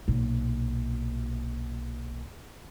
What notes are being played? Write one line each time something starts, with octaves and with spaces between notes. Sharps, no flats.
B1 A#2